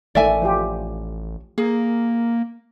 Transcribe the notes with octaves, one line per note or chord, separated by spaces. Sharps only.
A1 D#3 A3 D5 E5 G#5
F3 F4 G4
A#3 G#4